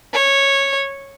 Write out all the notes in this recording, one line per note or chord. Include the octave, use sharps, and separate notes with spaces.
C#5